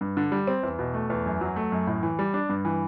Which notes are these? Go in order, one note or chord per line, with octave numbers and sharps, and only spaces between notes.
G2
D3
G3
C4
E2
B2
A3
E2
F#2
F#3
A3
F#2
A2
E3
G3
D4
G2
E3